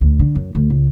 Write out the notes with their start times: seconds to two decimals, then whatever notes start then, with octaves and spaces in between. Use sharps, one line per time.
0.01 D2
0.19 D3
0.35 F#2
0.55 D2
0.70 C#2